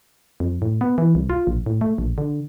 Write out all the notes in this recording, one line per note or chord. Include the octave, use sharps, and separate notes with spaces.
F2
A2
B3
E3
C2
F4
A#1
A2
A3
A#1
D3